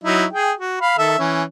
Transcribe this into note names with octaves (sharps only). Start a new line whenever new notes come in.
F#3 D#4 E4
G#4 G5
F#4
F5 B5
D#3 A4 E5
E3 C#4